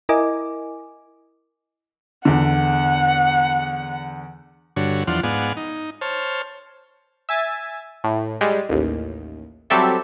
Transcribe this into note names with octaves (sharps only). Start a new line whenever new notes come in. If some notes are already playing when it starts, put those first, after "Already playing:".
E4 A#4 D#5 G#5 D6
E2 D3 F#5
G2 D3 F#4 C#5
E2 F3 D4 F#5 C6 F6
G#2 B3 D5 F5 F#5 G#5
D#4
C5 C#5 A5 F6
E5 G#5 A6
A2
G3 G#3
A1 D#2
F#3 G3 C4 G4 A4 E5